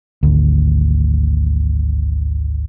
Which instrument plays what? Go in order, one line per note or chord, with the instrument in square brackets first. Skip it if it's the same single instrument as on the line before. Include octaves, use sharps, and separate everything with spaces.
[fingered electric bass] G#1 D2